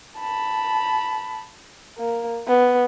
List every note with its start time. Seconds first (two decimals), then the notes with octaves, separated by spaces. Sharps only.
0.19 A5 B5
1.97 A#3
2.47 B3